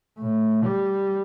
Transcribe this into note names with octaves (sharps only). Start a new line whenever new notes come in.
A2
G3